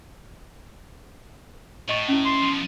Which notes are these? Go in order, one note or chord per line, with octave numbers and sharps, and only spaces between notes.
A2 D#5 C#6
C#4 E4
C6
B2 F3